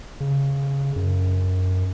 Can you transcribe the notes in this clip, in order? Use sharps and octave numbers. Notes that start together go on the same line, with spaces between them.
C#3
F#2